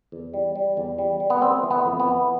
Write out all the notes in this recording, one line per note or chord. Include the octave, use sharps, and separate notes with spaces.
E2
G3
G3
E2
G3
G3
B3
G3 C4
E3
B3
F2
B3
E3